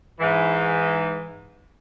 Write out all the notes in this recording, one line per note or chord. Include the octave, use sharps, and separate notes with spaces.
G#2 E3